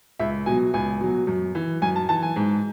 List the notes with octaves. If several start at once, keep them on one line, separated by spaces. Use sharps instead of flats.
C#2 E5
B2 F#3 G#5
C#2 G#5
B2 F#3
F#2
E3
F#2 G#5
A5
E3 A5
G#5
G#2